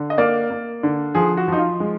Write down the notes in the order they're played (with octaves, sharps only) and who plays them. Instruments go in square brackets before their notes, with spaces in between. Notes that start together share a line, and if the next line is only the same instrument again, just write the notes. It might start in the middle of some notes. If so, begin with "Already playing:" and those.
Already playing: [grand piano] D3
D#5
A#3 D5
A#3
D3
F3 G#4
F#4
F3 D#4
F4
G#3